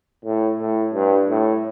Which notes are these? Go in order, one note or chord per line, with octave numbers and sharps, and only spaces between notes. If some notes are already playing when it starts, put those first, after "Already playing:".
A2
A2
G2
A2